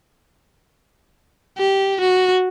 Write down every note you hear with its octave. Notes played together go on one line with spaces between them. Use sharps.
G4
F#4